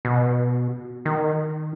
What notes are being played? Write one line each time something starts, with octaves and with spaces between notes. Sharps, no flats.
B2
D#3